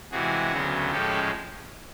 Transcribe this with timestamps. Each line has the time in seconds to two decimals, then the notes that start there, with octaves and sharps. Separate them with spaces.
0.12 C3 E3 G#3 F#4 G#4
0.52 D2 C#3 F#3 B3
0.91 A2 F3 G#3 C#4 G4 A4